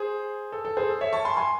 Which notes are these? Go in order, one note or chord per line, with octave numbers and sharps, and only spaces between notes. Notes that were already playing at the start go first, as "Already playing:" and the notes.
Already playing: G#4 C5
A4
A4
G#4 C5
A4
C#5 E5
A5 C#6
G#5 C6
G#5 C6